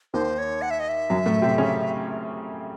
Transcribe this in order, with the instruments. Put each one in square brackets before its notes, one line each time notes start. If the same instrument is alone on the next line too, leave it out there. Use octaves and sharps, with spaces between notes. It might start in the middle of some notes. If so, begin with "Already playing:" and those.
[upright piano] D#2 D#3 [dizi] C5
[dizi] C#5
F#5
E5
D#5
E5
[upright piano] F#2 F#3
A2 A3
C3 C4
C#3 C#4